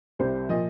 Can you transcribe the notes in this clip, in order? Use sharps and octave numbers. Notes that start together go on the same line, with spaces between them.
C2 C3 G3 C5
A#2 F3 D#5